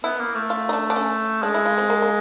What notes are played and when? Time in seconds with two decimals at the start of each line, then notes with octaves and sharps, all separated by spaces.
0.04 B3 E4
0.20 A#3
0.35 A3
0.50 F4
0.69 D#4
0.73 D4
0.90 D4
0.96 C#4
1.43 G#3 D4
1.54 E4
1.66 F4
1.78 C4
1.90 A#3
2.02 A#3